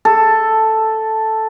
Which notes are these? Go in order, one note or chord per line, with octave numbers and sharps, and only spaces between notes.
A4